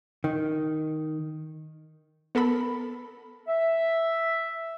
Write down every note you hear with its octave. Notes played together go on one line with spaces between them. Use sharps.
D#3
B3 A4 A#4 B5
E5